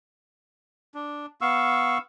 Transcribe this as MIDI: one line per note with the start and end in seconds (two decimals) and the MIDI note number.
0.94 1.26 62
1.41 1.98 59
1.41 1.98 77
1.41 1.98 85
1.41 1.98 88